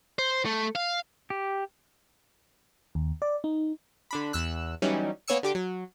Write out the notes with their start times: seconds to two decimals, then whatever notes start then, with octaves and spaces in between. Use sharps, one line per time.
0.19 C5
0.46 A3
0.75 F5
1.30 G4
2.95 D#2
3.22 D5
3.44 D#4
4.11 D3 D4 B5
4.33 E2 E6 F#6
4.82 E3 F#3 G3 B3 C#4 D#4
5.28 A#3 B3 C#5 G#5 E6 C#7
5.43 D3 G4 D6
5.55 F#3